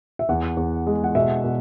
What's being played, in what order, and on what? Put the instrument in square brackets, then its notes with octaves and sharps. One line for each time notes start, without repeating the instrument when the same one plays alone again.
[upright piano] E5
[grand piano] E2 [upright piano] F#5
[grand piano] E2
G#3
[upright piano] F#5
[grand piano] B2 [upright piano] E5
[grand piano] B2